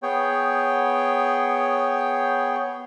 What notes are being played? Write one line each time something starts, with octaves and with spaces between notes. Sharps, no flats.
B3 G#4 C#5 G5